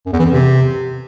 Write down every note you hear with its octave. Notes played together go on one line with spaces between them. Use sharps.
F#2
E2
E3
F2
C3